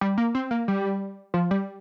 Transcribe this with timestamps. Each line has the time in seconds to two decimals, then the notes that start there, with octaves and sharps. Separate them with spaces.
0.01 G3
0.18 A#3
0.35 C4
0.51 A#3
0.68 G3
1.34 F3
1.51 G3